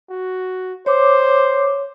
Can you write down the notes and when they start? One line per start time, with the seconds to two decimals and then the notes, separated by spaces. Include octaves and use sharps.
0.10 F#4
0.86 C5 C#5 D6